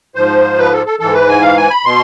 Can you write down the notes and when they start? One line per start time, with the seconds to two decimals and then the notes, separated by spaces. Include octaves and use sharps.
0.15 G#2 F3 C5
0.58 B4
0.72 A4
0.86 A4
1.00 G#2 E3 A4
1.14 B4
1.28 G#5
1.42 F5
1.57 G#5
1.70 B5
1.84 B2 C6